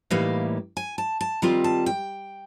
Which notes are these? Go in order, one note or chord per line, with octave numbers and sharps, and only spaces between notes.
A2 E3 G3 A#3 D#4 F5
G#5
A5
A5
D#3 G3 C4 F4 A#5
A5
G5